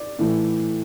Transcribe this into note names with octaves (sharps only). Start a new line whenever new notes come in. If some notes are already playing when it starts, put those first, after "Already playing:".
Already playing: D5
A2 E3 A3